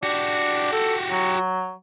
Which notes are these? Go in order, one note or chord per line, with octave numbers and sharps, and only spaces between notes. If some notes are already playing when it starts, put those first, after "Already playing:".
D4 F#4 G4
A4
F#3